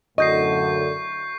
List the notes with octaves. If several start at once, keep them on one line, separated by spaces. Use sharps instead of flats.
F#2 A2 D3 D#5 C#6 G6 C7